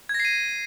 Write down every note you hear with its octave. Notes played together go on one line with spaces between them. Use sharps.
G#6
A#6
C7
D#7